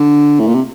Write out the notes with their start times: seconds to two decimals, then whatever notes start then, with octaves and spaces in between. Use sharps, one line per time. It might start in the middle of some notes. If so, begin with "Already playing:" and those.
Already playing: D3
0.40 A2
0.48 A#2
0.55 C3